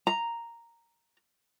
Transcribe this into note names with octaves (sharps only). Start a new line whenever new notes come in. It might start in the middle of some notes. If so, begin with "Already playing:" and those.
A#5